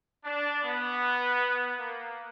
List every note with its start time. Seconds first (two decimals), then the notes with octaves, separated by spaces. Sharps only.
0.25 D4
0.63 B3
1.79 A#3